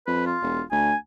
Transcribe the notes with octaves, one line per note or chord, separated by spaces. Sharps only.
F2 B4
F4
E1
D2 G#5